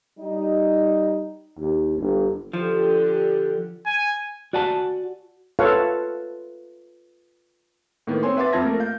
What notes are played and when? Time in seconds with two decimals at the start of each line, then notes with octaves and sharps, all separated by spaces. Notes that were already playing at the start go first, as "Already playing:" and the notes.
0.18 G3 D#4
1.58 D#2
1.98 G1
2.53 D3 F3 G4
3.86 G#5
4.53 F#4 D5 F#5 G#5 A5
5.59 F4 A4 B4 C#5 F5 F#5
8.07 A2 D#3 A#3 B3
8.23 C4 C#5 G#5 C6
8.37 B4 E5 F#5 C6 D6 A6
8.53 F2 C4 F4 A5 G#6 A#6
8.64 A3 A#3 A4 A#4
8.80 F5 G6